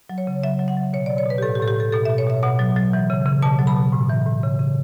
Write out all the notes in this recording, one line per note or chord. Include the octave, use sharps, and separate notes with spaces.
F#3
C#5
C#3
F#3 E5
F#3
F#5
F#3
B2 C#5
F#3 D5
C#5
B2 B4
G4
A2 A4
G4
A2 A4
G4
A2 A4
B2 A4
B2 E5
C#5
B2 E5
B2 F#5
F#3
F#3
E3
C#3
C#3
B2 A5
F#3
B5
B2
A2
E3
A2
C#3
C#3